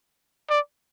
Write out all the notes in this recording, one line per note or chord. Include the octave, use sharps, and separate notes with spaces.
D5